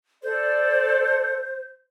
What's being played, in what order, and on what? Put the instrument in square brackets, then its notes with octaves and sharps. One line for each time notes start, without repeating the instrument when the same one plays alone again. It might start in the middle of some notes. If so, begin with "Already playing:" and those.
[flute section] A4 D5 [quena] C5